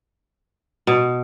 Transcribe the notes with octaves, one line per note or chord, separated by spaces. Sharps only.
B2